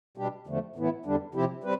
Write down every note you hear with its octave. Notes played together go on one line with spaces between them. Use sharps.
B2 G3 D4 G4
E2 D3 F3 A3
A2 E3 B3 E4
E2 D3 G3 D4
C3 F3 C4 E4 G4
G3 C4 B4